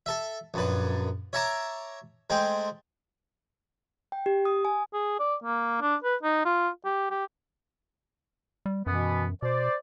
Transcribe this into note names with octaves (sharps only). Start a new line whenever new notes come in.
A4 E5
A#1 F#2 B4
C#5 E5 A5 A#5 D6
G#3 A3 C4 G5
G5
G4
D#6
G#5
G#4
D5
A#3
D4
B4
D#4
F4
G4
G4
G3
F#2 B2 E3 B3
B2 C5 D5